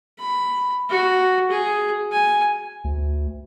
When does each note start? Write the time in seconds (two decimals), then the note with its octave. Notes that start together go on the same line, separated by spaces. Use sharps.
0.18 B5
0.89 F#4
1.50 G#4
2.11 G#5
2.84 D2